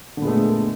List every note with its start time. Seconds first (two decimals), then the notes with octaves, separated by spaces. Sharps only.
0.17 D3
0.20 A#2
0.22 B3
0.25 G#3
0.27 A3